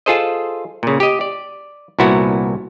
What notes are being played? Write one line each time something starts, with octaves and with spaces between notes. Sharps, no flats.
F4 G#4 A4 C5 D#5
A#2 C#3
G4 D#5
D5
C2 A#2 B3 E4 F#4